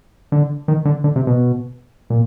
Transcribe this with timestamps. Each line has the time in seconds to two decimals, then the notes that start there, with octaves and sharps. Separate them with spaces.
0.32 D3
0.68 D#3
0.85 D3
1.04 D3
1.16 C3
1.27 B2
2.10 A#2